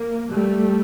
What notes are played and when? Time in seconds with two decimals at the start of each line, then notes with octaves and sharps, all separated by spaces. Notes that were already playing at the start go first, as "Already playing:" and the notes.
Already playing: A#3
0.31 G3 A3